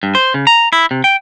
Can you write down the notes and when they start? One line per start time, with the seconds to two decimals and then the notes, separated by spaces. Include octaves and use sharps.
0.03 G2
0.15 C5
0.34 C#3
0.47 A#5
0.73 E4
0.91 C3
1.04 G5